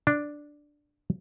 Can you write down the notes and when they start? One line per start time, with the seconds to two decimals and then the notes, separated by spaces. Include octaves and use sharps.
0.07 D4